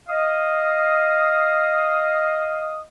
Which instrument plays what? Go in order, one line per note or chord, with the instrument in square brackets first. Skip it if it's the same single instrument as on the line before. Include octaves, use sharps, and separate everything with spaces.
[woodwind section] D#5 F5 D#6